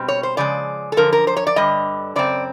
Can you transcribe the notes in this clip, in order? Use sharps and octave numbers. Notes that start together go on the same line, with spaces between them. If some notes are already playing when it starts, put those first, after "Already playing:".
Already playing: B2 G3 C4
C#5
C5
C#3 F3 G#3 D5
A4
F#2 D3 F3 A#4
A#4
C5
C#5
D5
G2 D3 G3 D#5
F#2 C#3 C4 D5